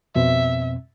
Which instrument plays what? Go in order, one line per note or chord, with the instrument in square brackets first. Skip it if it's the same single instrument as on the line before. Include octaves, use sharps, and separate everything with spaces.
[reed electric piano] F2 B2 C4 [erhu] E5